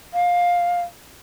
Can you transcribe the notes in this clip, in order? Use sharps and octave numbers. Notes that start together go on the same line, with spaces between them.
F5